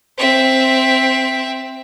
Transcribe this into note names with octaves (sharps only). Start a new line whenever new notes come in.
C4 E5